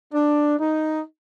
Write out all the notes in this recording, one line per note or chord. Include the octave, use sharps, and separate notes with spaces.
D4
D#4